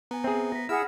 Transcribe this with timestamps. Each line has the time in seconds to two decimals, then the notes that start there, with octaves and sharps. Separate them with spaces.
0.11 B3 G#5 A#5
0.24 C4 G#4 E5 A#5
0.52 A#6 B6
0.69 E4 G#4 F#5 B5 E6 F6